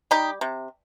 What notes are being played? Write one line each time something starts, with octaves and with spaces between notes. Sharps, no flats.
G3 D#4 G4
C3